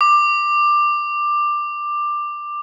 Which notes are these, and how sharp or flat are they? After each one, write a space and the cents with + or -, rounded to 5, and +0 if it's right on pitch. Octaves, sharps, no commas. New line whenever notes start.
D6 +15